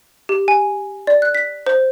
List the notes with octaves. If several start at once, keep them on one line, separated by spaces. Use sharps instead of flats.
G4
G#5
D5
F#6
B6
C5